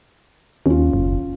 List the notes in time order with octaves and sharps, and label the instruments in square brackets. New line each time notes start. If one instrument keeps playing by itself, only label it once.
[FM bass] D#2 [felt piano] C#4 F4
[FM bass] F#1